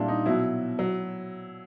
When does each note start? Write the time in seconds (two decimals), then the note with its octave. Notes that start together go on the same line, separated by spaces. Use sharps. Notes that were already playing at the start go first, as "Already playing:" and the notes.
Already playing: A#2 G3 D4 E4
0.08 D#4
0.26 B2 F#3 E4
0.79 F#3